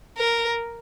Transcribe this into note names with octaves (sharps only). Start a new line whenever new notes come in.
A#4